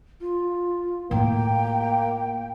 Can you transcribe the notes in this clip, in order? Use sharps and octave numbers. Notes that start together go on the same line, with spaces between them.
F4
A2 A#3 F4 G5